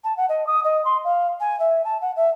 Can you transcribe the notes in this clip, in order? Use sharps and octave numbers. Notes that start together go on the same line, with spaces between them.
A5
F#5
D#5
D#6
D#5
C6
F5
G#5
E5
A5
F#5
E5